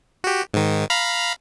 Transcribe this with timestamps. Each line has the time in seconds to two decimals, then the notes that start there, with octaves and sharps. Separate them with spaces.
0.24 F#4 G4
0.54 G#2 D#3
0.90 F5 A#5 B5